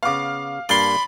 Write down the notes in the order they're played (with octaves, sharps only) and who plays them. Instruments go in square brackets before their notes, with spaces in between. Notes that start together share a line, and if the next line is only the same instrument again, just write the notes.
[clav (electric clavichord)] C#3 B3 [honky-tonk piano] F5 D6
[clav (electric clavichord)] G2 A#3 D4 [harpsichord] D5 C6 [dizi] B5